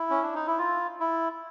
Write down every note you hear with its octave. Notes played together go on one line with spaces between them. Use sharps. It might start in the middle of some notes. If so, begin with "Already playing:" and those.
Already playing: E4
C#4
D4
D#4
E4
F4
E4